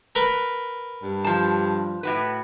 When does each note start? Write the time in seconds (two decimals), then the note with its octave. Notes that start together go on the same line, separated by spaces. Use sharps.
0.15 A#4 B4
1.03 G2
1.24 F3 A5
2.03 A2 F#4 B4